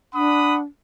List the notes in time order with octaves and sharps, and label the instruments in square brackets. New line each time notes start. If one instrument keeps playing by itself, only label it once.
[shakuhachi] D4 [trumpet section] F#5 B5 D#6